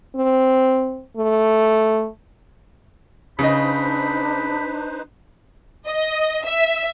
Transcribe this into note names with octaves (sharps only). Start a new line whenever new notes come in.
C4
A3
C#3 D4 D#4 B4 C5 D#5 B5
D#5
E5